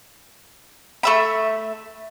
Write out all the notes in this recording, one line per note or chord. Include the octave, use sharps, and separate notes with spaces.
A3 E5 B5